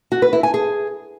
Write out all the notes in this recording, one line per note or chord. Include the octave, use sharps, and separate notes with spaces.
F#4
B4
E4
G#5
G#4